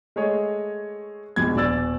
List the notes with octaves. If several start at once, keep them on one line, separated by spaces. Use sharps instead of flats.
G#3 A3 G#4 C#5 D#5
A#1 F2 B2 G#3 G#6
D#1 B2 D5 E6 A6